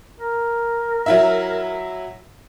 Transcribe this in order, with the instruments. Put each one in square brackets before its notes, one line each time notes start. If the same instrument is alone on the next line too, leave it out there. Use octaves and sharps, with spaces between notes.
[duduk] A#4
[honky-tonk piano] F#3 E4 E5